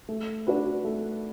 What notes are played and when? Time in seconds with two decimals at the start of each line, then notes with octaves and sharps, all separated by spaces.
0.09 A3
0.47 D4 F#4 B4
0.85 A3